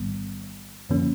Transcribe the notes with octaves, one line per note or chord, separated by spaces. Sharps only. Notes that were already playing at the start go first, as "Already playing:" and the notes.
Already playing: A1 G#2 D#3 G3 B3
F#2 D3 F3 A#3 C#4